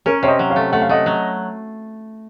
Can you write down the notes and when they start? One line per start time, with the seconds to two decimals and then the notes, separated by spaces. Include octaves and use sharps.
0.06 C#4 A#4 C#5
0.23 C3 C#5
0.28 C5 D#5
0.39 F#3
0.50 C#5 F5
0.56 A3
0.72 A3 F#5
0.82 F5
0.89 A3 D#5 F#5
1.06 F#3